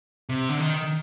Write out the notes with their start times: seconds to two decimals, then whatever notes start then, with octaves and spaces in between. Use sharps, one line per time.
0.29 C3
0.49 D3
0.60 D#3